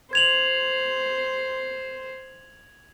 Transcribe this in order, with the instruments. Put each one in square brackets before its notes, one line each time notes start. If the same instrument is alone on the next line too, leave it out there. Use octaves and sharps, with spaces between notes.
[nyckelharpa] C5 [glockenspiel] G#6 F7 F#7